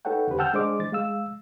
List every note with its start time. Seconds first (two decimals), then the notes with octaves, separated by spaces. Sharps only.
0.05 D#4 A4 B4 C#5 F#5 G5
0.27 E2 D3 C#4 G4 B4 C5
0.39 F#5 G5 A5 E6 F6 G6
0.53 G#3 D4 G#4 C5 D#5 D6
0.79 E3 A6
0.92 G#3 F5 E6